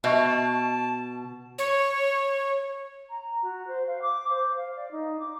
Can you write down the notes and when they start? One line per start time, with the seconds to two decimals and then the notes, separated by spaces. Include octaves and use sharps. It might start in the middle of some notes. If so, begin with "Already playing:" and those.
0.04 B2 D#5 E5 A5 C#6
1.58 C#5
3.10 A#5
3.42 F#4
3.67 C5
3.87 F5
4.02 D6
4.30 C5
4.57 F5
4.76 D5
4.91 D#4
5.20 D6